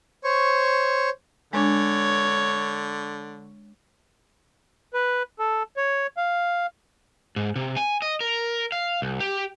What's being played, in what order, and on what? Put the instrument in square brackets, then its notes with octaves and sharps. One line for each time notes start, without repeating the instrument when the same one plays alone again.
[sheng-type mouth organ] C5 C#5 C#6
[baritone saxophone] D3 [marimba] G#3 D4 [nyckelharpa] C#5
[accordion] B4
A4
C#5
F5
[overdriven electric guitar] G#2
C3
G#5
D#5
A#4
F5
C2
G4